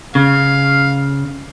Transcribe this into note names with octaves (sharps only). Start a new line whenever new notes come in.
C#3 F5